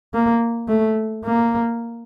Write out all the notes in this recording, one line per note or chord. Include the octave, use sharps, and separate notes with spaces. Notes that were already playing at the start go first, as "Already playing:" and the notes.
A#3
A3
A#3